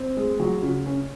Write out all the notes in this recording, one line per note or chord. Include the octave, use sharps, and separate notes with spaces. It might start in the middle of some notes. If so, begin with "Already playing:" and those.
Already playing: C4
G#3
F#3
C#3
C#4